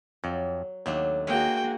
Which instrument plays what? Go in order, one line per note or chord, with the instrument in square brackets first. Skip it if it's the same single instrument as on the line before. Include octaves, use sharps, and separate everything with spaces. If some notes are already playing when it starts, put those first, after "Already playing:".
[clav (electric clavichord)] F2 [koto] F#3
[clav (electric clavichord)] D#2 [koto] F#3 A3 D4
[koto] G#3 [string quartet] A#3 F#4 G#4 [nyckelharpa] G5